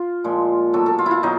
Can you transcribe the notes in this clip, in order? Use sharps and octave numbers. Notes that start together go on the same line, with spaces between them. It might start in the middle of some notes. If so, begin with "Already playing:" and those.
Already playing: F4
A#2 F3 G#3
B2 F#3 A4
A4
F4
E4
F4
B2 F#3 D#4